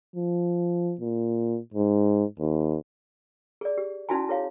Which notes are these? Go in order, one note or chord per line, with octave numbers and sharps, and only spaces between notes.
F3
A#2
G#2
D#2
G#4 D5
G4
C#4 D#4 E4 F#4 G#5 A5
E4 G#4 C#5 F5